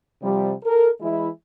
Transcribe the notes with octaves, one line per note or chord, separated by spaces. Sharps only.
C3 F3 G3
A4 A#4
E3 G#3 E4